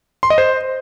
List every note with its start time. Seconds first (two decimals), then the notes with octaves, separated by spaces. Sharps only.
0.23 C6
0.30 D#5
0.38 C5